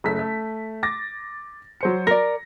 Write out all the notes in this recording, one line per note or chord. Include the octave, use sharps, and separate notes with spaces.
F#1 A3 B6
A3
D6 A6 A#6
F#3 C5 C#7
A#4 D5 A#6